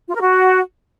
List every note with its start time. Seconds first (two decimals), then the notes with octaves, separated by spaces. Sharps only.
0.09 F4
0.14 A#4
0.20 F#4